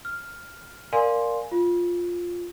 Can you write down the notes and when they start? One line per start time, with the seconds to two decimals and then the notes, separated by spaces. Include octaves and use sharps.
0.05 F6
0.93 A#4 D5 F5 G#5 C6
1.52 F4